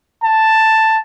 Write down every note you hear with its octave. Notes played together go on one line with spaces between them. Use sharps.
A5